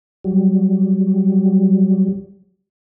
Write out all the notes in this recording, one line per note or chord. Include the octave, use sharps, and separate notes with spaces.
F#3 G3